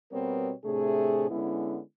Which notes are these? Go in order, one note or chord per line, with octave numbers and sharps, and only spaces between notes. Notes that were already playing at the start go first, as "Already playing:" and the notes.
B2 G3 B3 C4 A#4 C#5
A2 C3 A3 D4 G#4
D3 G#3 B3 C#4 E4